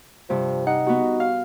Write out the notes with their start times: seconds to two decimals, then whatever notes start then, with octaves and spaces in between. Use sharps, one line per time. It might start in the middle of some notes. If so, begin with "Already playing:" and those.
0.30 G2 C3 F3
0.67 D#4 F#5
0.87 B3 F#4
1.20 F5